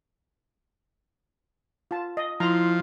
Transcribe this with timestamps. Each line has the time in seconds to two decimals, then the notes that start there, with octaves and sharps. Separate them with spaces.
1.91 F4 A5
2.17 D#5
2.40 F3 E4 A#5 C6